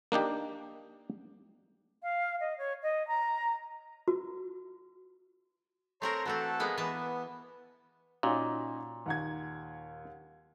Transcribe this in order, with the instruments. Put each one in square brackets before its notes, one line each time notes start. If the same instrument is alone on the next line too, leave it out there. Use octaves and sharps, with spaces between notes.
[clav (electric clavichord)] A#3 D4 D#4 G4
[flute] F5
D#5
C#5
D#5
A#5
[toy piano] F#4
[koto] A3 C4 A#4 [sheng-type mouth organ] C#5 A#5 C6
[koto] E3 A3 C4 [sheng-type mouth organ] F#4 A4 A5
[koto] G#3 A#3 B3
[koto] E3 E5 A5 [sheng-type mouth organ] B3
[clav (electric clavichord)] A#2 [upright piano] C#4 D#4 F#4
[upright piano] D#2 F#5 G#6